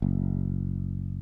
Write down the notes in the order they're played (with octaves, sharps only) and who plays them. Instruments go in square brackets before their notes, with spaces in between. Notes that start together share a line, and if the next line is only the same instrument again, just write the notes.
[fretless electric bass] F#1